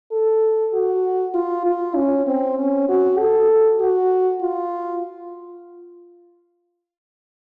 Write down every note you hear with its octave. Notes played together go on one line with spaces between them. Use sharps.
A4
F#4
F4
F4
C#4
C4
C#4
F#4
A4
F#4
F4